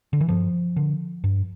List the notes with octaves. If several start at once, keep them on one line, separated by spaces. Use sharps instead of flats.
D3
E3
G2 F3
D3
G2